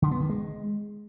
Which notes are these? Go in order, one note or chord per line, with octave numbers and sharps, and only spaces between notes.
D3
B3
D#3
G#3